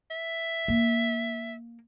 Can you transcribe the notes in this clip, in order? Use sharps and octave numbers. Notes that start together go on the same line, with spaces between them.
E5
A#3